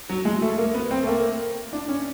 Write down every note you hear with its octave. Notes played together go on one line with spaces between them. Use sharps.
F#3
G#3
A3
A#3
B3
C4
A3
A#3
D4
C#4